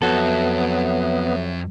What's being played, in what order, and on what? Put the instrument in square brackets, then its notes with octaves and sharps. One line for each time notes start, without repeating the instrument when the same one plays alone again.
[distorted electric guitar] F2 [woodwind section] F#3 E5 [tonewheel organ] B3 [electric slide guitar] F#4 A4